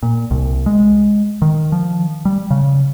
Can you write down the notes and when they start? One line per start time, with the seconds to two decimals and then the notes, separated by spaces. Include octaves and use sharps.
0.03 A#2
0.31 C2
0.66 G#3
1.42 D#3
1.72 F3
2.25 G3
2.51 C#3